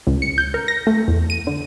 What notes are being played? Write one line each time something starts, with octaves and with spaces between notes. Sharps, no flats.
C#2
C#7
G6
A#4
A#6
A3
E2
D#7
D3